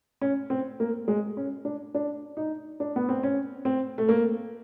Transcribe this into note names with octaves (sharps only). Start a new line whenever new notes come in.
C#4
C4
A#3
G#3
C#4
D4
D4
D#4
D4
B3
C4
C#4
C4
A3
A#3